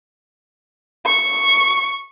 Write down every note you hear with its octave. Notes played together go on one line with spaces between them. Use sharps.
C#6